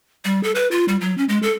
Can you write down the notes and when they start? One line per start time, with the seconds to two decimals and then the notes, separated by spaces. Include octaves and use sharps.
0.25 G3
0.43 A4
0.55 B4
0.71 F4
0.88 G3
1.01 F#3
1.18 C#4
1.29 G#3
1.43 A4